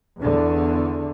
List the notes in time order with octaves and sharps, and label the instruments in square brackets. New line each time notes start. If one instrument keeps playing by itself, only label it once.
[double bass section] E2 D3